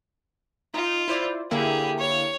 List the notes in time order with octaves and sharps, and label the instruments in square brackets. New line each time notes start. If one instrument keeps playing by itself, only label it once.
[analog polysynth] D#4 [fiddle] F4
[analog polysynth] E4 C5 D5
[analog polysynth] D3 A#3 E4 [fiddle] G4 G#4
[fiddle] C#5